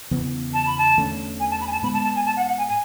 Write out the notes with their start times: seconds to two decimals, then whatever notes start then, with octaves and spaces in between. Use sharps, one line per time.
0.11 E2 C#3 E3 B3
0.54 A5
0.66 B5
0.78 A5
0.97 E2 D3 A3 C#4
1.40 G#5
1.51 A5
1.61 B5
1.67 G#5
1.72 A5
1.83 G#2 G#3 B3 B5
1.94 A5
2.04 A5
2.16 G#5
2.26 A5
2.37 F#5
2.47 F#5
2.58 G#5
2.69 G#5